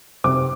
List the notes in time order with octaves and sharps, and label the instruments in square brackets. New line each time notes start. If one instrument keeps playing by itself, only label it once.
[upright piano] C3 D6